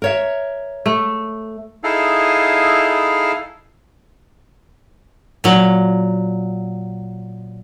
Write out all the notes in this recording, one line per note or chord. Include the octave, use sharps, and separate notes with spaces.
A#4 C#5 E5
A3
D#4 E4 G#4 A4 F5
A#2 F#3